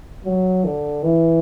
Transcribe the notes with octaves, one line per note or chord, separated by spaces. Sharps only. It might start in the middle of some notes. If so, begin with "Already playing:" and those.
F#3
D3
E3